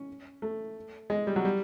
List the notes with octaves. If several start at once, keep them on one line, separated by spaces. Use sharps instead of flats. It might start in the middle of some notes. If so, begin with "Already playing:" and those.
Already playing: C#4
A3
G#3
G3
F#3
G3